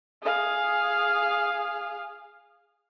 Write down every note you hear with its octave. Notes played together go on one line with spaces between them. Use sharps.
G#4 F5